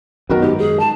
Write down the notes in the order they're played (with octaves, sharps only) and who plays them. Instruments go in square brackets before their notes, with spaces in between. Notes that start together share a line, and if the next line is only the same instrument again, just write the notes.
[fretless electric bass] F#2 D#3 [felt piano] B3 F#4 A#4
[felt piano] G#2 [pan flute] G4
[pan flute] G#4
A5